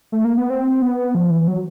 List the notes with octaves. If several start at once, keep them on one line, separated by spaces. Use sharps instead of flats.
A3
A#3
B3
C4
B3
F3
E3
F#3